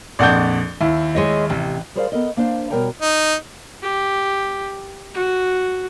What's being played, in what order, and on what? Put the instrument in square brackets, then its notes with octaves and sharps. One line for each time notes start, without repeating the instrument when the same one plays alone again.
[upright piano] A#1 F2 G6 [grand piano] D5 F#5 A5
[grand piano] D#2 [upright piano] E4
[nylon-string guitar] G#3 C#5 D#5
[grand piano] A1 [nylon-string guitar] C3
[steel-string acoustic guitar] G3 G#4 A#4 C5 D5 F5
B3 A4 A#4 D#5
A#3 D4 C5 F5
B2 G3 A#4 C#5 G5 A#5
[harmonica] D#4
[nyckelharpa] G4
F#4